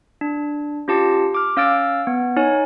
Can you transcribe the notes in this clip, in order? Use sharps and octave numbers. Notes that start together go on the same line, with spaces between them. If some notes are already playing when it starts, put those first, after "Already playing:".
D4
C#4 F4 G4 A5 C#7
D6 F6
C#4 F5 E6 F6 A6 D7
B3
D#4 C#5 G#5